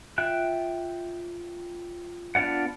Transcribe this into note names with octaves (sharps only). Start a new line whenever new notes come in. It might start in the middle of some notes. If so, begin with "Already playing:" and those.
F4 E5 G5 F#6
B3 D4 F4 D5 F#5